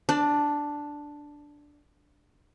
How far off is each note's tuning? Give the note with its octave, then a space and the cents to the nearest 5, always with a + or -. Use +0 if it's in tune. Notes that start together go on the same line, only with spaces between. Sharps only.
D4 +0 D5 +25